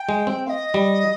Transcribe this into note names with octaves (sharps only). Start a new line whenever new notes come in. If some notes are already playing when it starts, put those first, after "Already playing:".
Already playing: G5
G#3
C4
F5
D#5
G3